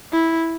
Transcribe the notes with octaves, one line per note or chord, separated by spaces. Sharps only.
E4